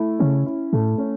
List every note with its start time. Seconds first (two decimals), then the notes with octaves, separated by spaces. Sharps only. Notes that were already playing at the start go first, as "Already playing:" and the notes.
Already playing: A3 E4
0.19 C#3 C#4
0.46 E4
0.73 A2 A3
0.98 C#4